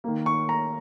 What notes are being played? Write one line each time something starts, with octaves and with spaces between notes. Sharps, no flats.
D#3 A#3
C#6
A#5